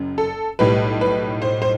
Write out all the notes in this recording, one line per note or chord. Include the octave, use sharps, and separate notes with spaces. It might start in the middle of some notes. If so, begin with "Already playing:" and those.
Already playing: F#1 F#2
A4
B1 A2 G3 B4
B4
C5
C5